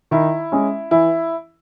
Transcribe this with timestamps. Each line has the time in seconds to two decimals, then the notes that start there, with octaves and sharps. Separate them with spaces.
0.11 D#3 E4
0.52 G#3 C#4
0.91 E3 E4